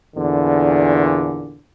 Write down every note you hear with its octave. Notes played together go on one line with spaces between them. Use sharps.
E2 A#2 D3